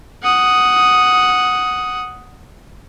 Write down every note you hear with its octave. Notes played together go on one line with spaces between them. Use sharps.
F#5 D#6